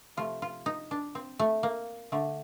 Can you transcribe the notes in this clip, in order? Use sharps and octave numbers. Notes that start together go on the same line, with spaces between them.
C3 F3 A3 F4
F4
D#4
D4
C4
A3
A#3
D3 A3